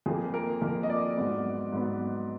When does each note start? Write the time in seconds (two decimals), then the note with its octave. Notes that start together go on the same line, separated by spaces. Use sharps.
0.06 F2 F3 A#3 G#4
0.34 A#4
0.61 F2 F3 A#3 A#4
0.83 D#5
0.90 D5
1.17 G#2 F#3 B3
1.72 G#2 F#3 B3